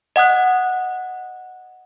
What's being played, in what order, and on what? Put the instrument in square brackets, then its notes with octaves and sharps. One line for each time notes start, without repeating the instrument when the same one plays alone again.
[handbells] D#5 F#5 D#6 F#6